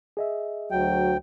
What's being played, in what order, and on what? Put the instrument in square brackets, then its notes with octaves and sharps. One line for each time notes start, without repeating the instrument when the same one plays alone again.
[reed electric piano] G#4 D#5 E5
[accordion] D2 G5 [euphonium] F#3